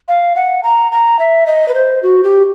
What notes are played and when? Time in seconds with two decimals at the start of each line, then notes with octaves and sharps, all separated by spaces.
0.08 F5
0.36 F#5
0.64 A#5
0.92 A#5
1.19 E5
1.47 D#5
1.68 B4
1.75 C5
2.03 F#4
2.24 G4